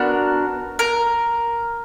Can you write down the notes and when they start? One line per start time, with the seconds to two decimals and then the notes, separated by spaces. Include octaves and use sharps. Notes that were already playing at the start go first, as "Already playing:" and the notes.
Already playing: B3 D4 F#4 A#4
0.79 A#4